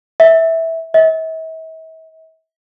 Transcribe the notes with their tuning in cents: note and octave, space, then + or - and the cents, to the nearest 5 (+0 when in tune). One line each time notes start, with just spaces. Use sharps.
E5 -10
E5 -45